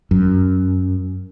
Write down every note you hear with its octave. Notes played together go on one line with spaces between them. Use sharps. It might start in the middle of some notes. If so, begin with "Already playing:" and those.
F#2